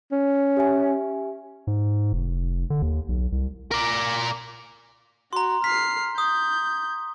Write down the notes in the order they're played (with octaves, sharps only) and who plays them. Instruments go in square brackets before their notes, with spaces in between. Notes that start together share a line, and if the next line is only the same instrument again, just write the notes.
[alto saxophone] C#4
[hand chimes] G4 E5 G#5
[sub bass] G#2
F1
D3
D#2
B1
C2
[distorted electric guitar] A#4 D5
[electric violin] F#4 [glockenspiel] A#5 C6
[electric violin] F6 C7 [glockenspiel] B6
[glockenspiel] D#6 [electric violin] G6